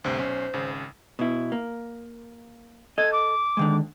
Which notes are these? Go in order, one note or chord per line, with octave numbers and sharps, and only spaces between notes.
D2 G2 C3 C5
B1 C#4
G#1 C#3
B2 E4
A#3
A4 D#5 G#6
D6
D3 D#3 G#3